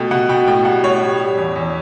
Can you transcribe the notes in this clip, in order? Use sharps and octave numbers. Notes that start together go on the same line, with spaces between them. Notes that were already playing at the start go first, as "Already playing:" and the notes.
Already playing: B2 A3 G5
B2 F#5
B2 G5
A2 G5
G3 F#5
A2 C#5
G3
G3
E2
E2